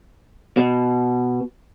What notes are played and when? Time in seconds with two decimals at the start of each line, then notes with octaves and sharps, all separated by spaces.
0.57 B2